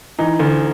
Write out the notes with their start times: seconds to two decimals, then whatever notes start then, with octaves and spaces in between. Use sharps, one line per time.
0.19 E3 D#4
0.39 D2